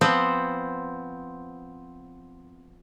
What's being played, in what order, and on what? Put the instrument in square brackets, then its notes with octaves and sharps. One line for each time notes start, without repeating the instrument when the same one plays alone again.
[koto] F3 B3 C4 C5